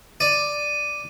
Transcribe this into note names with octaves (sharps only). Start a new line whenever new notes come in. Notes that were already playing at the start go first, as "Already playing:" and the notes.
D5 D#7